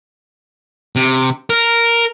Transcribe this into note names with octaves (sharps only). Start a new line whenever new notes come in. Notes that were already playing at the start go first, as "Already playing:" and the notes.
C3
A#4